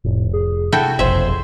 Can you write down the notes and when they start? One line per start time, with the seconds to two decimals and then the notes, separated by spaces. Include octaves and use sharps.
0.04 F1 A2
0.33 G#4
0.72 C3 E4 F#4 A4 G5
0.99 F#1 B1 F2 G#4 C5 E5